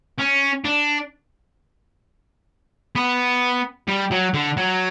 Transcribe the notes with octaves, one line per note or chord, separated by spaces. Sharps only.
C#4
D4
B3
G3
F#3
D3
F#3